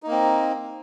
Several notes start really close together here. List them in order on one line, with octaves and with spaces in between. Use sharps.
D#4 A#3 C4